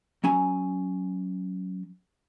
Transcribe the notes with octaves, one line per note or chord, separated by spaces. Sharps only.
F#3 C#4 G#5 A#5